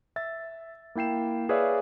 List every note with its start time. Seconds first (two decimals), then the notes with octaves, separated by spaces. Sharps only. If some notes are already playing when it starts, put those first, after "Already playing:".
0.16 E5 A6
0.95 A#3 E4 G5 C7 E7
1.49 G#4 B4 C#5 D5 E5 F5